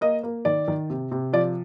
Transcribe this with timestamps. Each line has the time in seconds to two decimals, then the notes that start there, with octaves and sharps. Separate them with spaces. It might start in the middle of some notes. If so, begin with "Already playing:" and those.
0.01 A#3 D#5
0.23 A#3
0.45 D#3 D5
0.68 D#3
0.90 C3
1.11 C3
1.33 F3 D5